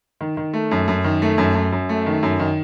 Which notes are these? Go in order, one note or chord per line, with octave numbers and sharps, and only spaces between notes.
D#3
D#3
A3
F#2
F#2
D#3
A3
F#2
F#2
F#2
A3
D#3
F#2
D#3